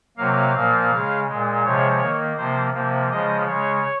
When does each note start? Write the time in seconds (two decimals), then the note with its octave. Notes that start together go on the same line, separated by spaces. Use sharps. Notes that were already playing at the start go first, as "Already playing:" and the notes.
0.17 C3 F#3 A#3 F5
0.54 A#2 F3 A#3
0.91 C#3 G#3
1.27 A#2 G#3
1.65 C3 F3 G#3 C#5
2.01 D#3 A#3
2.37 C3 F3 A#3 C5
2.73 C3 F3 A#3
3.10 C#3 F3 G#3 D#5
3.46 C#3 G#3 C#5